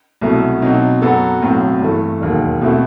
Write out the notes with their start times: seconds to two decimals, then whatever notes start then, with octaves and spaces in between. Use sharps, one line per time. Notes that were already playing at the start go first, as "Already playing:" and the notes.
0.21 C2 B2 F#3 A3 E4
0.62 B2 F#3 C4 D#4
1.02 F#2 F#3 B3 F#4 A4
1.41 B1 A2 F#3 C4
1.81 G2 E3 A3
2.21 E1 D#2 D#3 F#3
2.61 B2 A3 C4 E4